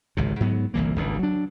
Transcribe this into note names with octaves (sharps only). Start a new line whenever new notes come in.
G#1 C#2 C3
G#2 F#3 B3
G1 C2 E3 A#3
G#1 C#2 D3
F#3 D4